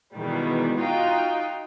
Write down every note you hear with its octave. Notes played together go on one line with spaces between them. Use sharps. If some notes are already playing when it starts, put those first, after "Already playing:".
B2 D#3 E3 G3 G#3
D#4 F4 F#4 D#5 F5 G5